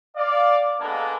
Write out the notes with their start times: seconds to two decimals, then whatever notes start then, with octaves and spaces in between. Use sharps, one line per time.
0.16 D5 F5
0.80 G#3 A#3 B3 D4 A4 A#4